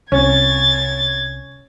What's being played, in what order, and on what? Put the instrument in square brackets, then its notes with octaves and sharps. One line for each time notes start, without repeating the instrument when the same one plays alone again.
[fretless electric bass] C2 [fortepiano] C#4 [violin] G#6 A6